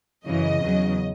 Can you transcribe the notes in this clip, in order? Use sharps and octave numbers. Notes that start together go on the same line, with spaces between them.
F#2 C#3 E3 D#5
E2 C#3 F#3